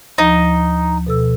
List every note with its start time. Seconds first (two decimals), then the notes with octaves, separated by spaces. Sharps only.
0.18 D2 F3 D#4
1.07 B2 A4 E6